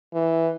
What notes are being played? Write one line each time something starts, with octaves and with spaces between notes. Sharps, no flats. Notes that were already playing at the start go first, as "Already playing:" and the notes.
E3